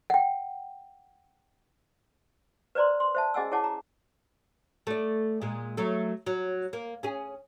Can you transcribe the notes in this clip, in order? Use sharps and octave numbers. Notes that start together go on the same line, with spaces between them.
F#5 G5
B4 C5 D5 A#5 C6
C6
C5 E5 A5
C#4 G#4 D#5 F#5 G#5 E6
E4 G#4 C#5 F#5 A5 D6
A#5
A3 D5
A#2 G#3
F#3 A3
F#3
A#3
C#4 G#4